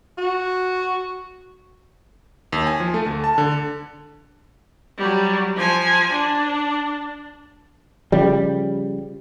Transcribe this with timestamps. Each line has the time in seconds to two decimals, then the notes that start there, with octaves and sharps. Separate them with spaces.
0.18 F#4
2.52 D#2
2.67 G#5
2.80 F3
2.94 A3
3.06 D2
3.24 A5
3.38 D3
4.98 F#3 G3
5.56 F3 G#5
6.12 D4
8.12 C#3 F3 G3